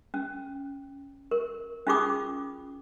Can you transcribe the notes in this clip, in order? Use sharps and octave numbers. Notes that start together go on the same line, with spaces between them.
C#4
A#4
C#4 D#4 F4 G#4 D6 D#6